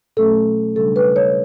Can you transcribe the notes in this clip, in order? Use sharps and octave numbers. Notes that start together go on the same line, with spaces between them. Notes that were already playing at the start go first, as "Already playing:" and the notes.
B2 F#3 A3 C#4 A4
C#3 G3 D4 A4
B4
C#5